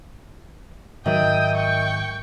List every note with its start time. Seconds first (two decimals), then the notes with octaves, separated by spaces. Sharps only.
1.06 G#2 D#3 F#3 A#4 D#5 E5 G5 D#6
1.55 G5 C#6